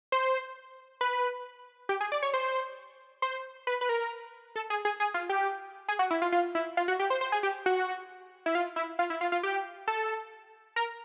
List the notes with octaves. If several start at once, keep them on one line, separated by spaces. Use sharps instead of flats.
C5
B4
G4
G#4
D5
C#5
C5
C5
B4
B4
A#4
A4
G#4
G#4
G#4
F4
G4
G#4
F#4
E4
F4
F4
E4
F4
F#4
G4
C5
C5
G#4
G4
F#4
E4
F4
E4
F4
E4
F4
F4
G4
A4
A#4